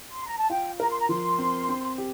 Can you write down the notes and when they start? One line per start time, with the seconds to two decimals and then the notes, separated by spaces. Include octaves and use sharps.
0.12 C6
0.25 A#5
0.38 A5
0.50 F4 G5
0.80 A#4 A#5
0.89 C6
0.99 A#5
1.09 F3 C6
1.38 C4
1.69 C4
1.98 G4